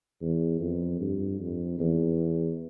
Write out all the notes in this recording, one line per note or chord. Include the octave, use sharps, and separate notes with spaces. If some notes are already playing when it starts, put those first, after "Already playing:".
E2
F2
G2
F2
E2